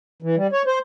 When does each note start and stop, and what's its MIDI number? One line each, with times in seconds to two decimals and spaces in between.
0.22 0.36 52
0.36 0.47 55
0.52 0.62 73
0.67 0.79 72